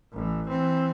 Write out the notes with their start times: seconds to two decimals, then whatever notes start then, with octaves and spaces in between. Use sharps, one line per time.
0.13 A1 E3
0.46 E3 C4